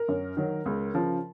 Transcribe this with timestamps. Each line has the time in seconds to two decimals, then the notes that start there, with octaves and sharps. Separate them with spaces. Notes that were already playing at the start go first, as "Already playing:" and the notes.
Already playing: A#4
0.08 F#2
0.37 D#3 F#3
0.66 C#2
0.94 C#3 F3